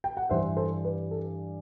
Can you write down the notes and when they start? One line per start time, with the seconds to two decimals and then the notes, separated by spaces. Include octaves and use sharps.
0.04 G5
0.17 F#5
0.30 G2 E3 G3 C5 E5
0.57 A4 C5
0.85 B4
1.11 A4